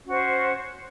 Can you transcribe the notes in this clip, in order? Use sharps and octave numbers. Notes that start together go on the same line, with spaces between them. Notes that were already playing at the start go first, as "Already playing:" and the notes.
C#4 F#4 C5